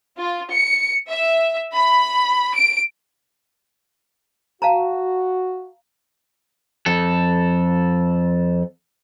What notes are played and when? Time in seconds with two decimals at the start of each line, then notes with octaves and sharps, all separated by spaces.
0.18 F4
0.52 C#7
1.10 E5
1.75 B5
2.54 D7
4.62 F#4 F5 A5 A#5
6.86 F2 A4